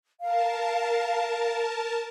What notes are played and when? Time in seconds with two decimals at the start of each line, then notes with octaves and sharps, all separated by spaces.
0.21 A#4 F5 A5